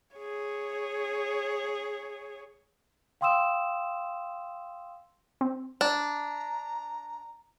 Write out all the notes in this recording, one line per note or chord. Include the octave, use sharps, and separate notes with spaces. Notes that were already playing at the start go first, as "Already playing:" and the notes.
G#4 C#5
F5 G5 C6 D#6 E6 E7
C4
D4 A#5